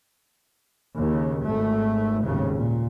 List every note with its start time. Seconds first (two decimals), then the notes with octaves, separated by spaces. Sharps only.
0.99 D#2 C#3
1.44 G#1 A3
2.24 G#1 D#2 A2 C#3
2.56 A#2